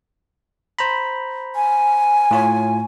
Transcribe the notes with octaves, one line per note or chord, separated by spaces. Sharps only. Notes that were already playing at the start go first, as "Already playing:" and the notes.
C5 A#5 B5
G#5
A2 F4 C#5